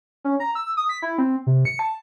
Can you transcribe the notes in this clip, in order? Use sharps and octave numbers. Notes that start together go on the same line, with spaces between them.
C#4
A#5
E6
D#6
B6
E4
C4
C3
C#7
A5